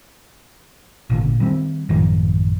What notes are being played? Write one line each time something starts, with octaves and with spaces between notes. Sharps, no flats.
G#1 A#2 D3
D#3 G3 C4
A1 F#2 D#3 F3